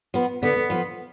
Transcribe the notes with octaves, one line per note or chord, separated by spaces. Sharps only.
F3 B3
D3 B3
F3 B3